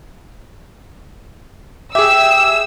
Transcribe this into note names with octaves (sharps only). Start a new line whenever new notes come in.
G4 G#4 E5 E6